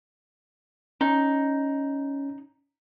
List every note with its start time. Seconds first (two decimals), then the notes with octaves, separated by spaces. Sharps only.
1.01 C#4 D#4